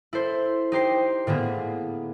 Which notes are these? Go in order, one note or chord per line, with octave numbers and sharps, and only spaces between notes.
E4 A4 C5
D#4 G4 C5 C7
A2 D3 A#3 B3 G#4